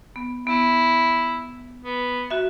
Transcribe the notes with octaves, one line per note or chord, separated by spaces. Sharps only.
B3
B3 E4
B3
F#4 E5